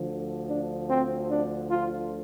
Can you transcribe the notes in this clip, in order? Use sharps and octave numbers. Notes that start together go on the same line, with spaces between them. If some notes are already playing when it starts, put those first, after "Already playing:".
Already playing: D2 D3 F3
D4
C4
D4
F4